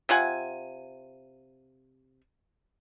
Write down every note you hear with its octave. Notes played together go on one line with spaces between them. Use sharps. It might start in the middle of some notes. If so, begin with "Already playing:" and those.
C3 F4 F#5 G#5